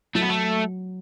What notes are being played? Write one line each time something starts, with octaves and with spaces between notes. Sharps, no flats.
F#3 A3
B3
A3